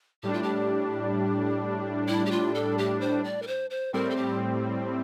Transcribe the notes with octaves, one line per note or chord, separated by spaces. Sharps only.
A2 G3 D4 G4
F4
G4
E4
G4
F4
A4
G4
C5
D5
A#4
C5
C5
A2 G3 C4 A#4
A4
G4